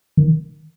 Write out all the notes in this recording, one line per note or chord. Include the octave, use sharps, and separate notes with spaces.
D#3